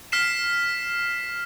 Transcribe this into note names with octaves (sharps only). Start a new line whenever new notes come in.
F6 B6 C7 E7